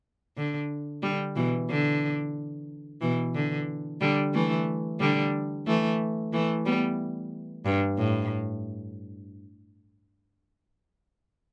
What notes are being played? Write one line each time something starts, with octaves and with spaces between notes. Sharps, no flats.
D3
D3 G3
B2 E3
D3
B2 E3
D3
D3 G3
E3 A3
D3 G3
E3 A3
E3 A3
G3 B3
G2
A2